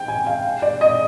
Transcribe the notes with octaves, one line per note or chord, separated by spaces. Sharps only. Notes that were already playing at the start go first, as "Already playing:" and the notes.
Already playing: G5
G#5
F5
D5
D#5